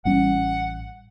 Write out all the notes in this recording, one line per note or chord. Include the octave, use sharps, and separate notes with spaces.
A1 G3 C#4 F#5